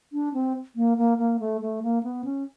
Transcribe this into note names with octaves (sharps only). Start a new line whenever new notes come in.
D4
C4
A#3
A#3
A#3
A3
A3
A#3
B3
C#4